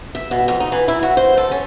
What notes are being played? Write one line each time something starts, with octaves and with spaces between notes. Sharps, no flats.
E5
B2
F2
D#4
E3
E4
F#4
C5
A4
C#4